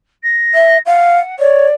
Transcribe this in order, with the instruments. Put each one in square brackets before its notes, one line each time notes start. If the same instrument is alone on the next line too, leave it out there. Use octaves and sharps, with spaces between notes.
[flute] A#6
[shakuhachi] E5
[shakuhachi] F5 [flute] F#5
[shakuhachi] C#5 [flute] D5